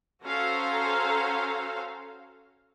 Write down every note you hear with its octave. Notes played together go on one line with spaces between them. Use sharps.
C#4 F#4 A4 C5 F5 A#5